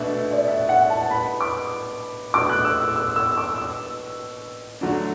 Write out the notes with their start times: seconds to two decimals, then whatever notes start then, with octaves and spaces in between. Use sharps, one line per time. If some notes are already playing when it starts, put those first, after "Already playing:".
Already playing: B2 A3 D4 E5
0.18 E5
0.33 D5
0.48 E5
0.69 F#5
0.90 A5
1.11 B5
1.41 D6
2.34 B2 A3 D4 F#4 D6
2.49 F#6
2.64 E6
2.80 E6
2.96 E6
3.16 E6
3.37 D6
3.58 E6
4.81 D3 F#3 A3 D4 F#4